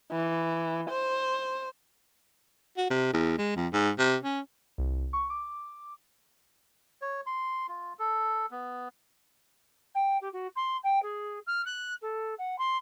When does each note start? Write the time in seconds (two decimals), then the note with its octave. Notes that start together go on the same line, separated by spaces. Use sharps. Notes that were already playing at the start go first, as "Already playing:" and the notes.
0.11 E3
0.90 C5
2.78 F#4
2.90 C3
3.13 E2
3.39 G#3
3.57 F2
3.73 G#2
3.99 C3
4.23 C#4
4.78 C2
5.13 C#6
5.30 D6
7.02 C#5
7.26 C6
7.68 F4
7.99 A4
8.51 B3
9.95 G5
10.21 G4
10.33 F#4
10.56 C6
10.83 G5
11.02 G#4
11.47 F6
11.65 F#6
12.01 A4
12.38 F#5
12.58 C6